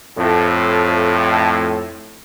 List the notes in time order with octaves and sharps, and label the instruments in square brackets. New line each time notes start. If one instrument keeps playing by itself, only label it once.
[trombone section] F2 A2